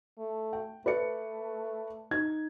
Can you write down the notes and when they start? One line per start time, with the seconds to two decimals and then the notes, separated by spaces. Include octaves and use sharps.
0.18 A3
0.53 G5
0.86 A3 B4 D5 C#7
2.11 D#4 G#6